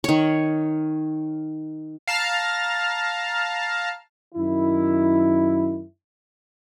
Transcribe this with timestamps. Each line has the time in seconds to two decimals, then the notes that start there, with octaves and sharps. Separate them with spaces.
0.04 D#3 C#5
2.07 F5 A5 A#5 F6
4.35 F#2 D#3 E4